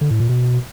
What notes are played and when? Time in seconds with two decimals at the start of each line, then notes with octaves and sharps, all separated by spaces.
0.01 D3
0.11 A2
0.20 A#2
0.29 B2